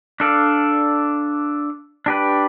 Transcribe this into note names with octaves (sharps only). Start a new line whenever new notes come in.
D4 A4 D5 F5
D4 G4 B4